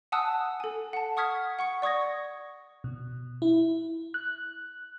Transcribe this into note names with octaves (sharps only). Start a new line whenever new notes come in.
F#5 G#5 A5 D#6 E6 F#6
A4 G#5
F#5 A5
F#5 C#6 D#6 F6 G#6 B6
F#5 C#6 C#7
D5 C#6 D#6 G#6 A#6
B2
E4
F#6